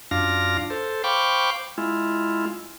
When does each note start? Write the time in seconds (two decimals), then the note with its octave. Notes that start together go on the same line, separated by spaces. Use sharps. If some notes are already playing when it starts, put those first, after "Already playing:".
0.11 F#2 D4 F4 F5 A#6
0.70 A4 C5
1.04 C5 F5 G5 B5 C#6 D6
1.78 G#3 E4 F4